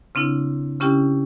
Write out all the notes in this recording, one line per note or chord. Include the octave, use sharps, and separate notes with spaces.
C#3 C4 D4 E4
C#3 C#4 E4 G4 G5